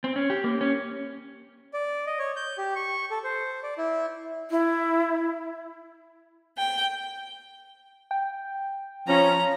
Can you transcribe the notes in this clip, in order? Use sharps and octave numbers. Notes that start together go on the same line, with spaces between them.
C4
C#4
G4
A#3
C#4
D5
D#5
C#5
G6
G4
C#6
A4
C5
D5
E4
E4
G5
G5
F3 C#4 A#5